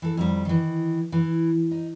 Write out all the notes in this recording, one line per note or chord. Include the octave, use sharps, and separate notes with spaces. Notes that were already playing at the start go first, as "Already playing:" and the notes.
E3 A4
F2 D#3 G3
D#3 E3
E3
D#4